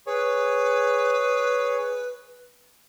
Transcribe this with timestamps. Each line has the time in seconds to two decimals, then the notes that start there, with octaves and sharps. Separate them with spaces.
0.07 G#4 B4 C#5